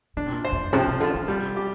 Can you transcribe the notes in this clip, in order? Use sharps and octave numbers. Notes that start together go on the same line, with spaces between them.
D3 D4
C3
A#2
C5
F2
G2
C3 F3
C3
D3 F4
D3
C3 G3
G4